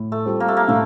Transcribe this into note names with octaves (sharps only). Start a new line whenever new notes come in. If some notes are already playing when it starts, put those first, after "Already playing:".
Already playing: A2
A3
G3 C4 F4
A#3
A3
A#3
A2 A3